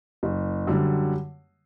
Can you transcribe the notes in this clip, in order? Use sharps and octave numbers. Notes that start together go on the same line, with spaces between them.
F#1
F#2 D3 G3